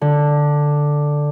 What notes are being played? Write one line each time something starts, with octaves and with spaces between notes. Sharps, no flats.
D3